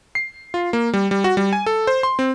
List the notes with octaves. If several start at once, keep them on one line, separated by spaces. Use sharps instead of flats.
C7
F4
A#3
G3
G3
F#4
G3
G#5
A4
C5
C6
C4